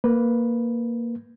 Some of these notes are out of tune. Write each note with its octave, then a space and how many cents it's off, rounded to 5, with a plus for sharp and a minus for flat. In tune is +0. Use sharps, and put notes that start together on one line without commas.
A#3 +0 B4 +0